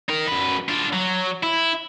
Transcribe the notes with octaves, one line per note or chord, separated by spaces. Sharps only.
D#4 A#4
F#2 B4
D4 F4
F#3
E4